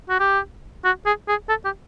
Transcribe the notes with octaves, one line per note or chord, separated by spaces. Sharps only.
F#4
G4
F#4
G#4
G#4
A4
G4